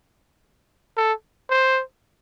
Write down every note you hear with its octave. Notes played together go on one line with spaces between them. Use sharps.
A4
C5